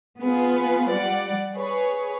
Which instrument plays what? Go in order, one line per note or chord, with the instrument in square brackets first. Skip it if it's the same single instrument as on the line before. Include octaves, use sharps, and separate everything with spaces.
[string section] B3 F4 G#4 B4
G3 D5 F#5
G#4 B4 C#5